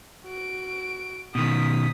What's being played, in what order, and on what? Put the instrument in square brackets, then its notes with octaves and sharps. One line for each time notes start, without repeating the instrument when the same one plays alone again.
[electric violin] F#4 D7
[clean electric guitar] B2 D#3 [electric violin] D#6 B6